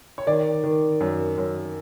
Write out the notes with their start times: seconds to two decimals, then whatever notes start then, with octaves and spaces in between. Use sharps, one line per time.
0.18 C#5
0.27 D#3 D5
0.64 D#3
1.00 F#2
1.38 F#2